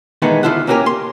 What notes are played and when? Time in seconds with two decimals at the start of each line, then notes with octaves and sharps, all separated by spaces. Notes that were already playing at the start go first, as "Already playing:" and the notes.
0.22 D#3 E3 G#3 A3 B3 D#4
0.43 D2 E4 F4 A4 F#5
0.67 A#3 C#4 F#4 G4 A#4 G#5
0.86 C6